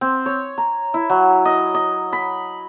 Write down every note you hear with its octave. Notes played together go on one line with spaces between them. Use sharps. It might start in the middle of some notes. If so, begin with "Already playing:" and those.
C4
C#5
A#5
E4
F#3
D#5
D#5
B5